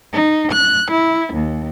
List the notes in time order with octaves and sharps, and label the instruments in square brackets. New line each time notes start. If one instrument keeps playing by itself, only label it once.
[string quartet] D#4
F#6
E4
D#2